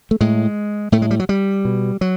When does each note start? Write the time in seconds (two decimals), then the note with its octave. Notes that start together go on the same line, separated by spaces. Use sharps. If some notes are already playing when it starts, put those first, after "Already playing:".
0.11 A3
0.21 A2 G#3
0.92 A2 A3
1.02 G#3
1.11 G3
1.19 F#3
1.29 G3
1.65 B2
2.01 F#3